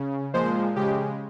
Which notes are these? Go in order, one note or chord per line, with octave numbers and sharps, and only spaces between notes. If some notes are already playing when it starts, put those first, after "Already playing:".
Already playing: C#3
A#2 F3 G#3 C5
C#3 G#3 G4